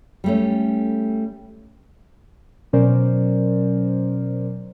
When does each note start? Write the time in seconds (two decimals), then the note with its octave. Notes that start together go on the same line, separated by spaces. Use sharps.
0.24 G3 A3 C#4
2.73 B2 F#3 C#4 A#4 C5 D5